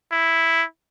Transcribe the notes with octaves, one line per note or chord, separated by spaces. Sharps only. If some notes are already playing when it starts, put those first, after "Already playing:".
E4